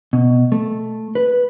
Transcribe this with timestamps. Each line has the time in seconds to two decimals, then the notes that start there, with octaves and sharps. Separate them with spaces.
0.13 B2
0.52 A3
1.15 B4